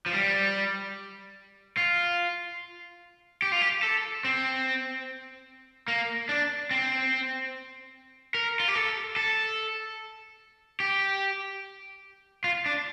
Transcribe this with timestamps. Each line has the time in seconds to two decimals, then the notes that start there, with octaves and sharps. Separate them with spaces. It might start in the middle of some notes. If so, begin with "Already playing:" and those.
0.06 F3
0.13 G3
1.78 F4
3.42 G4
3.52 F4
3.61 G4
3.83 A4
4.25 C4
5.88 A#3
6.29 D4
6.71 C4
8.35 A#4
8.60 F4
8.68 G4
8.75 A4
9.16 A4
10.80 G4
12.44 F4
12.66 D4